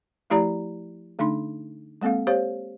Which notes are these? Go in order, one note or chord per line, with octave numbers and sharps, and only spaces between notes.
F3 A3 E4 G4 D5 A#5
D3 A3 D4 D#4 C6
G#3 A#3 C4 A4 F5
G4 C5 C#5 F5